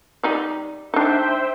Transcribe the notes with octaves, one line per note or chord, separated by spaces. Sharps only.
G3 D#4 D5
D4 D#4 C5 E5 G5